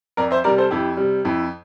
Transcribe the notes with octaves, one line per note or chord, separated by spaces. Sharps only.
F2 A#4 D5
C5 E5
C3 G3 A#4 D5
A4 C5
F2 E4 G4
C3 G3
F2 E4